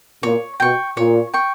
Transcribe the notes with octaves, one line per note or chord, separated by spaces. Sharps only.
A#2 C#5
B2 G5 C#6
A#2 C#5
G5 C#6